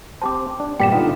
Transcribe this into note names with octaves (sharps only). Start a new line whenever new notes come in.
C4 G4 C5 A5 D6
D4
G2 A#2 B3 G4 D5 G5 B6 E7
D3 B3 D4 D#4 F4